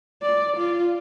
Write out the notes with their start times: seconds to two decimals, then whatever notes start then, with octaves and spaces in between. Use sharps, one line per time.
0.22 D5
0.57 F4